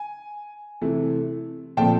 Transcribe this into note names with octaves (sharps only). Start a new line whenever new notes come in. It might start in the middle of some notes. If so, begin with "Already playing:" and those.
Already playing: G#5
C3 E3 A3
A#2 F3 A3 C4 G5 A5